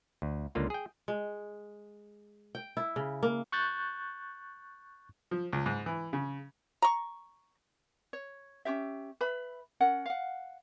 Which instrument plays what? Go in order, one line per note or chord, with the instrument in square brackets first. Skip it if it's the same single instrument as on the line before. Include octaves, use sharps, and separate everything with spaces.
[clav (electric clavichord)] D2
C#2 D3 A#3 F4
G#4 G5
[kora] G#3
G5
E4
C#3
A#3
[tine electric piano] C#6 F#6 G6 A6
[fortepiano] F3
C#2
G#2
E3
C#3
[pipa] A#5 C#6
[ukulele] C#5
C#4 F4 G4 E5
B4 E5 B5
C#4 A#4 F#5
F5 F#5